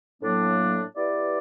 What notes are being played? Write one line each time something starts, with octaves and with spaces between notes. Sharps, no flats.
A2 F#3 A#3 D4
B3 E4 G4 B4 D5